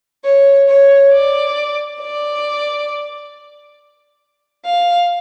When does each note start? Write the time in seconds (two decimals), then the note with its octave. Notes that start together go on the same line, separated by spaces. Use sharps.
0.24 C#5
0.68 C#5
1.12 D5
2.01 D5
4.66 F5